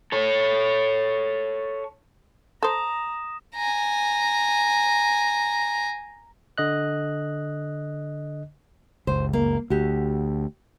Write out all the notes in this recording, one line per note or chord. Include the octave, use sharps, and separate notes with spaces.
A4 C#5
A4 C5 A#5 D#6 A#6 E7
G#5 A#5
D3 D#5 F#6
F#1 C#2 C5
A#3
D2 F#4 G4